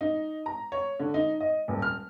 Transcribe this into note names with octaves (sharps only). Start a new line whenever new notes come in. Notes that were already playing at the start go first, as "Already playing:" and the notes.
D#4
A#5
C#5
D3
D#4
D#5
D#1
F6